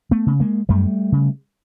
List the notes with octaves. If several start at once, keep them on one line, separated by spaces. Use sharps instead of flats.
A3 B3
C#3
G#3 A#3
F#2 G3 A3
C#3